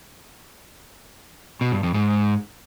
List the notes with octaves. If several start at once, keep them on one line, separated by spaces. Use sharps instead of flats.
B2
G2
F2
G#2